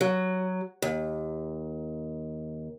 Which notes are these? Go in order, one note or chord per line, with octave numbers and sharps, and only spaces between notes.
F#3
D#2